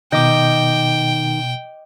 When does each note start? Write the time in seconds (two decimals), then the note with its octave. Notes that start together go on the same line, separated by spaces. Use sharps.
0.12 B2 D#3 D#5 G5 D6 G6